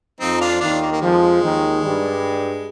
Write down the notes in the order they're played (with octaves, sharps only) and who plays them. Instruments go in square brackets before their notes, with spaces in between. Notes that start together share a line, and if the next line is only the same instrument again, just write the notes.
[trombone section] F2 F3 [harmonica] C4 D#4
[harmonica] D4 F4
[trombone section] D#2 D#3 [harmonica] D4 F4
[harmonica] A#3
A#3
[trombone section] F2 F3 [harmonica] G#3
[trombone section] D#2 D#3
G2 G3